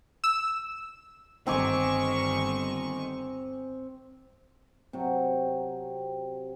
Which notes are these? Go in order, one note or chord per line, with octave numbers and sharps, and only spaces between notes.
E6
G1 D#3 C4 G#5 C#6 D6
C3 F#3